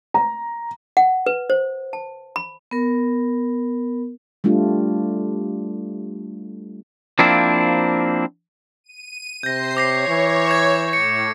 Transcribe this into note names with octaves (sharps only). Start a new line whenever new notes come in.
A#5
F#5
B4
C5
A5
B5
B3 A#4
G3 A3 D4 F4
F3 A#3 C4 D4 E4
D#7
C3 C5 G6 A#6 C7
C#5 D6 A#6 C7
E3
C#6 G#6
A2 C#7